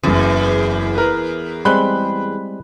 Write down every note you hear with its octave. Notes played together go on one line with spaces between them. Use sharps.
F#1 E2 C#3
A#4 B4
G3 G#3 C4 B5 F#6 G7